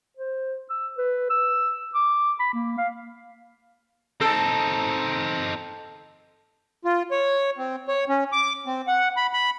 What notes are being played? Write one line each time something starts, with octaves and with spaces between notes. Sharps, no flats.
C5
E6
B4
E6
D6
B5
A#3
F5
C4 D#4 A4
F4
C#5
C4
C#5
C#4
D6
C4
F#5
B5
B5